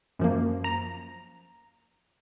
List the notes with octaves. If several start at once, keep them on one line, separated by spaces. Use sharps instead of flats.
F#2 F3 A#3
A#5